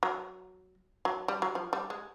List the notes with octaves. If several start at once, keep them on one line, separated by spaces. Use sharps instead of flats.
F#3
F#3
G3
F#3
F3
G3
G#3